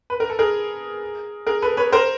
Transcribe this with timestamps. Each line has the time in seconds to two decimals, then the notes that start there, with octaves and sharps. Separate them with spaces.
0.10 B4
0.20 A#4
0.30 A4
0.39 G#4 A#4
1.47 G#4 A#4
1.62 A4 B4
1.77 B4 C#5
1.93 A#4 C5